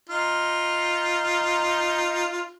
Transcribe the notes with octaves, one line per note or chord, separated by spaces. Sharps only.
D#4 F4